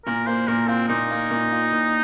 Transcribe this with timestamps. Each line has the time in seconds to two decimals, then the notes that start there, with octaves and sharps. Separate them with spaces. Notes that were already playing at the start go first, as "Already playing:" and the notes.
0.06 A#2 A#4
0.27 A#3 C5
0.48 A#2 A#4
0.68 C4 F4
0.89 A#2 D#4
1.10 A#3
1.31 A#2
1.52 F4
1.72 A#2